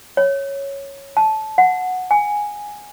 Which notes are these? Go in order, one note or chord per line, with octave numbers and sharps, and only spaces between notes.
C#5
A5
F#5
G#5